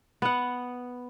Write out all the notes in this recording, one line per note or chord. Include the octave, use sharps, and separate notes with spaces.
B3 F#5